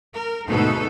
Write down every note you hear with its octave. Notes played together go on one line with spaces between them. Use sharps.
A#4
D2 G#2 B2 A3 D#4 A4